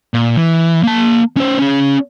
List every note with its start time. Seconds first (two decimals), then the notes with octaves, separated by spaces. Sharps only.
0.14 A#2
0.37 E3
0.83 A#3 A5
1.37 C#4 C5
1.59 C#4 G#4